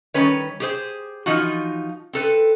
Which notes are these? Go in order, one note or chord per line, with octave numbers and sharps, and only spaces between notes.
D#3 G3 C#4 B4 C#5
G4 G#4 C5
E3 F3 D#4 F4 F#4
C4 A4 B4